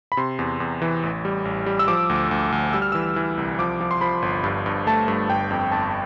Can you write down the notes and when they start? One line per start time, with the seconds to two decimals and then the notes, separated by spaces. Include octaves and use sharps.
0.12 B5
0.17 C3 C6
0.39 E2
0.60 E2
0.82 E3
1.03 A1
1.25 G3
1.45 A1
1.66 G3
1.79 E6
1.88 F3 D6
2.09 D2
2.31 D2
2.52 D2
2.73 G3 E6
2.82 F6
2.92 E3 E6
3.16 E3
3.37 C2
3.59 F3 D6
3.81 F3
3.91 C6
4.01 F3 B5
4.22 G1
4.44 G2
4.66 G2
4.87 A3 A5
5.08 G2
5.30 G1 G5
5.51 F2
5.72 G1 A5